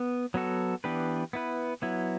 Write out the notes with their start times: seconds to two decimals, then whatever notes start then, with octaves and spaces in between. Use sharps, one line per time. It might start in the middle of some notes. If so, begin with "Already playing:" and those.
Already playing: B3
0.34 F#3 B3 F#4 A4
0.84 E3 B3 D4 G4 B4
1.33 B3 E4 B4
1.82 F#3 B3 E4